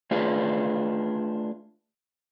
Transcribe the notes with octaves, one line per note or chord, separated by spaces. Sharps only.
A3 D4 F4 G#4 B4